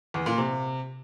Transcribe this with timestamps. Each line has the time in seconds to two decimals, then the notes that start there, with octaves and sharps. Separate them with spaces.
0.14 E2
0.26 A#2
0.38 C3